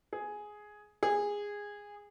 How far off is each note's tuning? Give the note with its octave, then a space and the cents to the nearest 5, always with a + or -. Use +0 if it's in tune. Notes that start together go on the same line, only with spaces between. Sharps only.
G#4 +5
G#4 -15